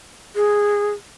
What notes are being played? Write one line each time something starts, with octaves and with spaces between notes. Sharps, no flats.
G#4